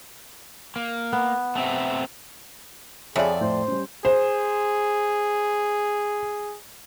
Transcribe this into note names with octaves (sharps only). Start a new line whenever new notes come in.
A#3
B3
A3 C4 E5
F2 G#4 C#5 D5 E5 B5
A2 C5
G3 C#4
G#4 C5